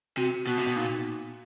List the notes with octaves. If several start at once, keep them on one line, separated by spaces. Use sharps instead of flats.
C3 F#4
B2 F#4
C3
B2
A#2 D#4